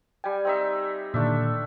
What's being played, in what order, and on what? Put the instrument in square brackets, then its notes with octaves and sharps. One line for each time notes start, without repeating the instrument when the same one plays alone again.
[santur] G3 G#5 [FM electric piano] G5
[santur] C4 D#4 E5
[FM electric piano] A#2 D3 D#3 [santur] A3 D4 E5